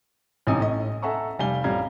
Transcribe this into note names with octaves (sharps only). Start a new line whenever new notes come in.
A1 G#2 C3 D#4 G#5 D#6
A2 C#4 D#5
A4 E5 F#5 G#5 A#5 C#6
F1 G3 F5 G#5 G7
A1 F2 G3 F5 A#5 G#6